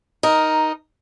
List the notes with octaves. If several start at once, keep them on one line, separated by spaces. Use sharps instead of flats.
D#4 A#4